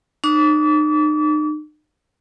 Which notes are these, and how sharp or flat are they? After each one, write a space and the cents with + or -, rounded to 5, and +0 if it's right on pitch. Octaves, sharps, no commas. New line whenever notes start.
D#4 -35 D6 -35